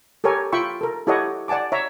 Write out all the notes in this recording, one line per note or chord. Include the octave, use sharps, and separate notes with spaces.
G4 A4 A#4 C#5 G#5
F4 E5 G5 B5 C#6 E6
A4 A#4
E4 G4 A4 C#5 D#5 F#5
D5 F#5 G#5 A5 D6
C#5 E5 A#5